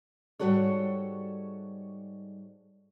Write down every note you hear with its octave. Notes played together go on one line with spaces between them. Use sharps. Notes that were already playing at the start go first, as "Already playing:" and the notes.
G#2 C#3 G3 F#4 A4 C#5